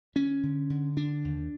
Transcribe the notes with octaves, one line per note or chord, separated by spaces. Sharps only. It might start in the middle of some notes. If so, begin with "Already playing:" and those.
D3 C#4
D3
D3
D3 D4
D#2